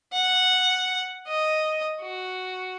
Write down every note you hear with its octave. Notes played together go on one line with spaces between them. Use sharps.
F#5
D#5
F#4